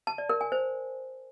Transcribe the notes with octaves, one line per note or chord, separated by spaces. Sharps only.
A5
D5
A#4
G#5
C5